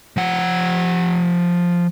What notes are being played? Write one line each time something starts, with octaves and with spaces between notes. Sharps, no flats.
F3 F#5